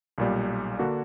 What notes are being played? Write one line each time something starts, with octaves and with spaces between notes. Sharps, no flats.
B1 A#2 G3
D3 A#3 D4 F#4